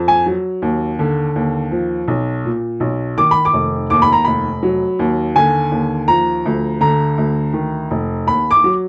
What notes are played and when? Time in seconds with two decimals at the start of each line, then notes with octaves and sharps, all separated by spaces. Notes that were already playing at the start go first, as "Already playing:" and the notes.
Already playing: F2
0.08 G#5
0.26 F#3
0.62 D#2
0.99 D3
1.36 D#2
1.71 F3
2.08 B1
2.45 A#2
2.80 B1
3.18 D#3 D6
3.31 B5
3.45 D6
3.53 F1
3.90 D#2 D6
4.02 B5
4.13 A#5
4.25 F1 B5
4.63 F#3
4.99 D#2
5.36 D3 G#5
5.72 D#2
6.08 F3 A#5
6.45 D2
6.81 D3 A#5
7.18 D2
7.54 D#3
7.91 F1
8.27 D#2 B5
8.51 D6
8.64 F#3